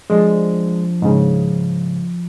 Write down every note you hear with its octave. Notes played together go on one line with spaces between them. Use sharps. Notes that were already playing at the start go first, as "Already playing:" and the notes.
F3 G#3 D4
G#2 C#3